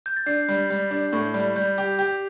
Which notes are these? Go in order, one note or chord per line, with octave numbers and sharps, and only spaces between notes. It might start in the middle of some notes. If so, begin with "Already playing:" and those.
G6
A6
D4 G6 C7
G3
G3
D4
A2
G3
G3 G6
G4
G4